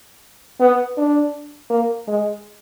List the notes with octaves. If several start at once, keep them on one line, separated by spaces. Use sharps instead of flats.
B3
D4
A#3
G#3